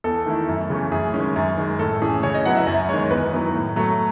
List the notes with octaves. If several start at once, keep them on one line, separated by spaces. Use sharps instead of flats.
E2 A4
D#3 A3 E4
F#2
C#3 E3 A3
F#2 G#4
D#3 G#3 C#4
F#2
D#3 G#3
A2 A4
E3 A3 C#4 G#4
C#3 C#5
D#5
F#3 B3 E4 F#5
E5
F#2 D#5
D#3 G#3 C#5
E2 B4
D#3 F#3 B3 E4
A2
F#3 A3